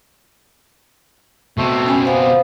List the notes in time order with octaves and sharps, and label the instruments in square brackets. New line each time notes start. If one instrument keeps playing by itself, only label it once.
[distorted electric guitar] B2 C4 [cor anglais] A3
[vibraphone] C#4 G#5 B5
[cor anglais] B3 [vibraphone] C5 F5